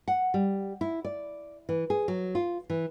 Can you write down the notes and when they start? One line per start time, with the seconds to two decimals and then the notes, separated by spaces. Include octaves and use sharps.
0.08 F#5
0.34 G3
0.81 E4
1.05 D5
1.69 E3
1.90 G#4
2.08 F#3
2.35 F4
2.70 E3